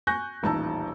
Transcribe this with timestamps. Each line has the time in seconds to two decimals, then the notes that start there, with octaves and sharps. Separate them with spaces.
0.07 G#5 C#6 F#6 G6 A#6
0.43 D#1 A1 D#4 A5 A#5 E6